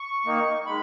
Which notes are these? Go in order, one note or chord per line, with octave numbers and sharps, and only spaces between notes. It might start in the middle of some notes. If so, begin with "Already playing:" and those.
Already playing: C#6
D#3 A#3 D#4
D#3 G#3 B5